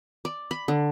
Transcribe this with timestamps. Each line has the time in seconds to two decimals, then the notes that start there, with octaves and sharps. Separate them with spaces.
0.25 D5
0.51 B5
0.68 D3